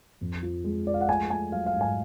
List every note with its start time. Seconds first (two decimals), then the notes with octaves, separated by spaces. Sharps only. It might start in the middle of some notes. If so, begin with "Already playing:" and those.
0.21 F2
0.43 F3
0.64 G#3
0.86 F3 D5
0.94 F5
1.01 F#5
1.09 A3 G#5
1.30 A3 G#5
1.52 F#3 F5
1.66 F5
1.74 G#2
1.81 G#5